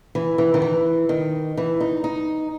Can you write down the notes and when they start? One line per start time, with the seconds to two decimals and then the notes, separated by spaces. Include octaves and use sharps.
0.15 E3
0.38 E3
0.54 D#3
0.62 E3
1.09 D#3
1.57 E3
1.80 D#4
2.04 D#4